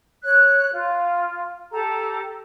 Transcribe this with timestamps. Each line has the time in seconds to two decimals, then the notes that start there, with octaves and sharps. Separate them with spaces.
0.23 C#5 F#6
0.71 F4
1.71 G4 A4 A#5